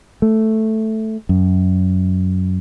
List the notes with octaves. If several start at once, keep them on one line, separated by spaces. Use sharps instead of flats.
A3
F#2